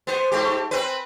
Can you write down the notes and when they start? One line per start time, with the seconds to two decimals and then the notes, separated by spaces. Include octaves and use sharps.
0.07 B3 C5
0.32 G#2 A3 G4
0.71 C4 B4